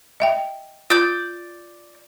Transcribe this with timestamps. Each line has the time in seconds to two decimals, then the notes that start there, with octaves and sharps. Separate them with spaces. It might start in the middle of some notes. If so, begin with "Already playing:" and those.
0.20 D#5 E5 G5
0.90 F4 D5 G6